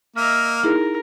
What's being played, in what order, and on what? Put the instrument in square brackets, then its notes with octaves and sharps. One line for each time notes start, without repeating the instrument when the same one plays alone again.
[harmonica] A#3 [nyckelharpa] D#5 E5 [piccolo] F6
[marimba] D#4 E4 G#4 [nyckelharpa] A#4